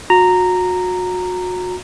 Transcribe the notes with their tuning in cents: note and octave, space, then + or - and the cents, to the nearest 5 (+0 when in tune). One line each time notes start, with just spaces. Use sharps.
F#4 -30 A#5 -10